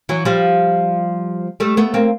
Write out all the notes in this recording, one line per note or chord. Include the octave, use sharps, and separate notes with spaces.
E3 F#3
F3 G3
G3 A3
A3 B3
A#3 C4